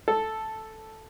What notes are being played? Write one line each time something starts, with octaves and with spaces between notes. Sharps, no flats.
A4